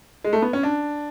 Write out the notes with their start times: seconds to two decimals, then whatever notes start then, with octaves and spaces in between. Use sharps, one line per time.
0.25 G#3
0.33 A3
0.42 B3
0.53 C#4
0.63 D4